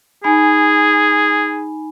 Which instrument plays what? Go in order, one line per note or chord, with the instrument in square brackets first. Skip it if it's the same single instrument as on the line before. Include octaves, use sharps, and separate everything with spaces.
[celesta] D#4 G#5 B5 [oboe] G#4